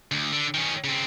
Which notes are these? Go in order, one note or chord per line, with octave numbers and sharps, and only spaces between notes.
D2
D3
D#3 C#4
C#3 C4